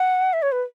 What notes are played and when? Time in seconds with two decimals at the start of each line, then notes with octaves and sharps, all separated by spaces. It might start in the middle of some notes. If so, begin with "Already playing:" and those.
Already playing: F#5
0.33 E5
0.42 C#5
0.52 B4